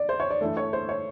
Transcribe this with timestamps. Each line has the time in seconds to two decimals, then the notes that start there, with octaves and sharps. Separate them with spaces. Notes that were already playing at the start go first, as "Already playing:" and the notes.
Already playing: D5
0.09 C5
0.20 C#5
0.30 D5
0.41 G2 E3 A3
0.57 C#5
0.73 C5
0.89 C#5